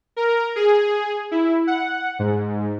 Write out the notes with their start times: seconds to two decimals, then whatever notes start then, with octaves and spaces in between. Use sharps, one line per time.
0.16 A#4
0.56 G#4
1.31 E4
1.67 F#5
2.19 G#2